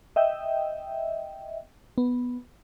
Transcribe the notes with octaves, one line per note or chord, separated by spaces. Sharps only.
D#5 E5 G5
B3